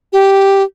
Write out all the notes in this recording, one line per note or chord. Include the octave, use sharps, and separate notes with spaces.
G4